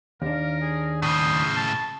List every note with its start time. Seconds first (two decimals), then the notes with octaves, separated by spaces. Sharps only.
0.22 D#2 D4 A#4 F5
0.62 G#4
1.02 A2 C#3 C5 D#6
1.56 A5